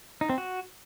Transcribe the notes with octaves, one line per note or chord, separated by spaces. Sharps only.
D#4
C4
F#4